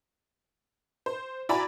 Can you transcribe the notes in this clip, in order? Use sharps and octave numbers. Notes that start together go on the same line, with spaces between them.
C5
E4 F#4 D5 G#5 A#5 B5